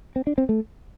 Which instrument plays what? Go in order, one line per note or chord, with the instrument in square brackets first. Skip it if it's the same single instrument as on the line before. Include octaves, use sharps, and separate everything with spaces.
[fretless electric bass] C4
D4
C4
A3